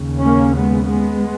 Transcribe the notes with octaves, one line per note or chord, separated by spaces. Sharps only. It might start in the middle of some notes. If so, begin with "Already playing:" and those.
Already playing: D#2 C#3
A#3 C#4
G#3 B3
G#3 B3